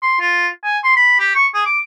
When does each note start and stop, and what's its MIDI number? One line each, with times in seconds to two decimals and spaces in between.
0.02 0.16 84
0.21 0.48 65
0.64 0.79 80
0.84 0.95 84
0.97 1.17 83
1.19 1.35 67
1.35 1.47 85
1.54 1.66 68
1.66 1.80 86